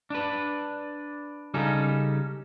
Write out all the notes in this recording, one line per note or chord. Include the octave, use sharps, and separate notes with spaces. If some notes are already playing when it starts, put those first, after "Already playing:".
D4 B4
C#3 G3 C#4 D#4 A4